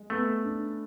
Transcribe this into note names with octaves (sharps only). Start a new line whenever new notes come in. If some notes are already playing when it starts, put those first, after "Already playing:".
Already playing: G#3
A3 B3
D4